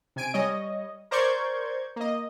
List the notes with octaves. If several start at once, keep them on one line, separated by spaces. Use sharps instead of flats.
C3 G#5 D7
G3 C#5 D#5
A#4 C5 D5 C#6 G6 G#6
A#3 D#5